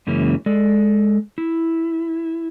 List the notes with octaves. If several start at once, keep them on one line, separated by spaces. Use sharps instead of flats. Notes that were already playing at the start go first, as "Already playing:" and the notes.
F#2 C#3 E3 G#3 A#3 C#4
G#3 A4 D5
E4